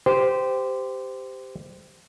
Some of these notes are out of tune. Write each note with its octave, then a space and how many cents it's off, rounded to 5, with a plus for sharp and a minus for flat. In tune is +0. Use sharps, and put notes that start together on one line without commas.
G4 +0 C5 -20